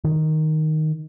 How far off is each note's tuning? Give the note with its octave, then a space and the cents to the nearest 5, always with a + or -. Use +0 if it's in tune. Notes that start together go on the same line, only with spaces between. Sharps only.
D#3 +0